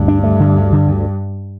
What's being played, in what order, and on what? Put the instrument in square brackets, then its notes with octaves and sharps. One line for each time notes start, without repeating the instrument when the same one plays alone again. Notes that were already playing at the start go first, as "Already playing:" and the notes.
Already playing: [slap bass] D2 [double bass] G2
[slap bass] D4
A3
D3
D2
D3
D2